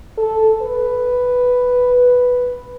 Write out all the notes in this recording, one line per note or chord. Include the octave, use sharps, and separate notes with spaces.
A4
B4